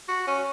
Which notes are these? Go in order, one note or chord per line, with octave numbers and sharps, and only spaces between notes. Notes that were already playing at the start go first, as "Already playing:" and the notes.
F#4
C#4